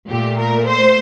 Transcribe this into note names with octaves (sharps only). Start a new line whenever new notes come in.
A#2 A3 G4
A#4
C5